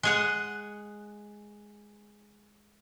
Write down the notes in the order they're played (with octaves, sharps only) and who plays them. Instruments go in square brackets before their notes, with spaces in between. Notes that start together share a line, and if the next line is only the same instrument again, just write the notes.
[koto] G#3 G#4 F#5